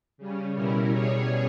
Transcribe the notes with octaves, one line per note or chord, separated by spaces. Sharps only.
C#3 G3 C#4
B2 G3 C#4 E4 A#4
B2 G3 C#4 G#4 C#5